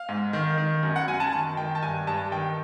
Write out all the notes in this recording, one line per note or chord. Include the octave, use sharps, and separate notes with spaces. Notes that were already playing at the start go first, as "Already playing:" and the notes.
Already playing: F5
G#2
D#3
D#3
F#2
F#5
F#2 G#5
A5
D#3 A5
D#3 G5
A5
G2 G#5
G2 A5
D#3 G5